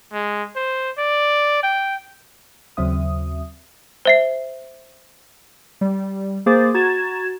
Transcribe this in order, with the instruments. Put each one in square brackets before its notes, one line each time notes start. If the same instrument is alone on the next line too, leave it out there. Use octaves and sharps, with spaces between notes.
[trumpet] G#3
C5
D5
G5
[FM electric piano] D#2 C#3 F#3 C4 E5 D#6
[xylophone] C5 E5 C7
[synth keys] G3
A#3 G#4 C5 D6 A6
F#4 A#5 G#6 A6 E7